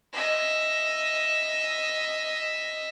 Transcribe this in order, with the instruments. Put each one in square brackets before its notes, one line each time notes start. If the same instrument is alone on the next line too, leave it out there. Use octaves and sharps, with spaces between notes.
[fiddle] D#5 E5